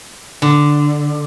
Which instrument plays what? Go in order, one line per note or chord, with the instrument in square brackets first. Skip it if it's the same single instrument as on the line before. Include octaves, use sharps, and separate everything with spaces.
[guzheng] D3